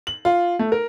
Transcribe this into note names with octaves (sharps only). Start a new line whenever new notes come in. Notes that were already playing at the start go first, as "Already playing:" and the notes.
F#7
F4
A3
A#4